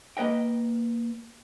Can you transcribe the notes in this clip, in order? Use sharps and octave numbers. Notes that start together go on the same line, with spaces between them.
A#3 B4 D#5 G5